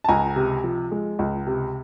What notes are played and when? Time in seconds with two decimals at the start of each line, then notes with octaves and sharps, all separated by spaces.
0.04 A5
0.09 C#2 G#5 A#5
0.36 C3
0.64 F3
0.91 G#3
1.19 C#2
1.47 C3